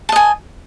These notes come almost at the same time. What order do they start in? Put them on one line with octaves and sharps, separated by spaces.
A5 D#5 G#5